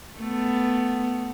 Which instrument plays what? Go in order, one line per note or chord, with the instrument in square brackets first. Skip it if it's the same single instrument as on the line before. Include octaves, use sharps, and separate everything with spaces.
[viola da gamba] A3 B3